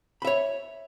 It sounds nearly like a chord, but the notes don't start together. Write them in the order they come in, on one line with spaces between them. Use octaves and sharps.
B5 E5 C#5